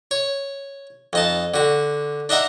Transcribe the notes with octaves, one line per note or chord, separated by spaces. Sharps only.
C#5
F2 D#4 A5
D3 F#4
D4 D#4 E5 F#5 A#5